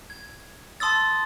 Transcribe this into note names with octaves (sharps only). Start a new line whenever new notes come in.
G#6
A5 C6 D#6 E6 A6